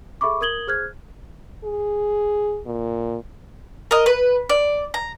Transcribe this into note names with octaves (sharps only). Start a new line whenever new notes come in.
G#4 A4 E5 B5 C#6 D6
A#4 D#6 G#6 F#7 G7
G#4 C5 F6 F#6 G#6
G#4
A#2
A#4 D#5
B4
D5
A#5